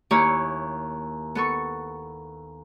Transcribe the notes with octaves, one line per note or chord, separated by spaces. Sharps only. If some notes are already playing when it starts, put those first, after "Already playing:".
D#2 A#3 E4 G4 C#5 C#6
B3 A4 C#6